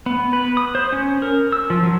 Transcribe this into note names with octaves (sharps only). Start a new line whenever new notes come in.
B3
B4
D#6
C5
C#4
A#4
E6
F3
F#3